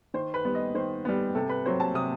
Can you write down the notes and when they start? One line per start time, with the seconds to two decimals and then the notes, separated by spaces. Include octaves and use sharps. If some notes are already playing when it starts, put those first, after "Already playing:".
0.14 D#3 C5
0.34 B4
0.45 G3 B3
0.55 D#5
0.74 D#3 C5
1.05 G3 B3
1.35 C3 A4
1.49 B4
1.65 F#3 C4 C5
1.80 A5
1.95 C3 D#6